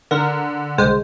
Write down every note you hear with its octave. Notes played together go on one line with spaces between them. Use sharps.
D3 A#4
C2 G#3 C5